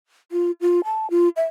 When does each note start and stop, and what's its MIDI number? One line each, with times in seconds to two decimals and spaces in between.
0.32 0.51 65
0.61 0.81 65
0.85 1.10 81
1.10 1.29 65
1.36 1.45 76